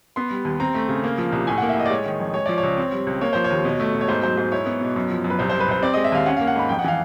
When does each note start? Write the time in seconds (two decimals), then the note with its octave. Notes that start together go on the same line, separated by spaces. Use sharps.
0.16 B3 C6
0.31 G3
0.45 D#2
0.60 C4 A#5
0.74 A3
0.89 C#3
1.04 A#3
1.18 F3
1.32 C2
1.47 A2 G#5
1.58 F#5
1.62 A#3
1.69 E5
1.76 A2 D#5
1.86 D5
1.90 G#3 C#5
2.05 D#3
2.20 F2
2.34 G#3 C#5
2.46 F3 D5
2.58 C#5
2.63 C#2
2.77 C4
2.92 G3
3.07 C#2
3.21 A#3 C#5
3.33 F3 C5
3.44 C#5
3.50 D#2
3.65 B2
3.80 A3
3.94 B2
4.01 C#5
4.08 G#2 C5
4.23 F#3 C5
4.37 G#2 C5
4.52 E4 C#5
4.66 B3
4.80 B2
4.96 F#2
5.10 F3
5.24 F#2
5.30 B4
5.39 C2 C5
5.50 C5
5.53 G3
5.60 B4
5.68 C2 C5
5.82 C4 D5
5.94 D#5
5.97 G#3
6.04 E5
6.12 D#2 F5
6.26 C#4 F#5
6.37 F5
6.41 A#3
6.47 F#5
6.56 G#2 B5
6.69 F2 G5
6.79 F#5
6.84 E3 F5